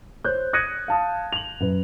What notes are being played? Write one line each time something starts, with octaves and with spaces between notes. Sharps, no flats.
C5 C#5 F#6 G6
D#6 F#6 G#6 A#6 C#7 D#7
F5 A5 D#6
F7 F#7
F#2 B4